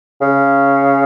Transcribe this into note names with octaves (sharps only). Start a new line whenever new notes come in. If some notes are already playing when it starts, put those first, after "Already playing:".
C#3